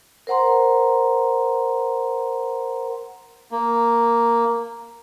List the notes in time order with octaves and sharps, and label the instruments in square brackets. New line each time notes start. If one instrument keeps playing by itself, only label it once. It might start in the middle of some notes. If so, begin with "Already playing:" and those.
[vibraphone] A#4 C5 F#5 A#5 C6
[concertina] A#3